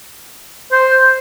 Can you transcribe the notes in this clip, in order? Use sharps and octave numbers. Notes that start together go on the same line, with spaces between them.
C5